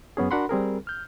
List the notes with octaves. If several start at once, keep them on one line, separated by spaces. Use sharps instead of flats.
F#2 B3 C#4 G#4
D4 F#4 A#4 F#5 B5 C6
G3 C4 G#4 A#4
F6 G6